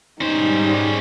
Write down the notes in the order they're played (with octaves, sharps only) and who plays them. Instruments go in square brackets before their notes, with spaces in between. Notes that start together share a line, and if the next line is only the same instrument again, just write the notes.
[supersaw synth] G#2 G3 [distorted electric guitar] C#4 C5 [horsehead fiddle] D#4